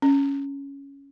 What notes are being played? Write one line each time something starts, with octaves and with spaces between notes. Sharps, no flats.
C#4